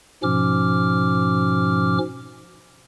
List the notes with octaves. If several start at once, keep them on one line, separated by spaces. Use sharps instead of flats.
G#2 B2 F3 C#4 D6 F6